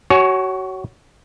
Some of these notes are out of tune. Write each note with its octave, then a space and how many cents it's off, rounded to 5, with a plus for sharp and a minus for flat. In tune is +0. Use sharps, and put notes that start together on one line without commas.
F#4 +30 C#5 +0 G#5 +30